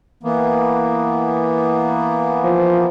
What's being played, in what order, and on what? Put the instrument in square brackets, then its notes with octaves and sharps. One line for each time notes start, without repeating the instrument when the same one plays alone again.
[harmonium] E3 A#3 B3
[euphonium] F3